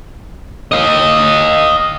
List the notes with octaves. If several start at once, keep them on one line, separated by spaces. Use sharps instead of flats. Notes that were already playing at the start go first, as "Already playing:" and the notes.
D#5 F5